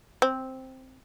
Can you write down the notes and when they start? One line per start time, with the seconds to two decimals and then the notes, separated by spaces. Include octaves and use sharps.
0.22 C4